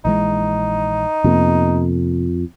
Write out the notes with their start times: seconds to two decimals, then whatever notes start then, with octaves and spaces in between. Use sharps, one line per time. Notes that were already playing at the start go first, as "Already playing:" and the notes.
0.05 A#1 E3 G#3 D#4
1.24 F2 C3 A#3 B3